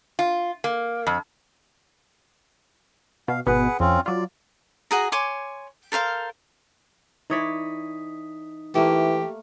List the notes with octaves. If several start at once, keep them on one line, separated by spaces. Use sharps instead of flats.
F4
A#3
F2
B2 F5
G#1 B2 B3 G#4 B4 F#5
F2 C4 C#4 F4
F#3 F4 D5
F#4 G#4 A#5
C#5 G#5 C6 D6
A4 A#4 C5 F5
E3 D#4 C#5 D5 D#6 B6
E3 A3 A#3 G4